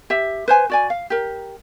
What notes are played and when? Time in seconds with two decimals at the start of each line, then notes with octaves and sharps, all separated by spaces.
0.10 G4 E5
0.48 B4 C5 G#5
0.70 F#4 D5 G#5
0.90 F5
1.10 G4 A#4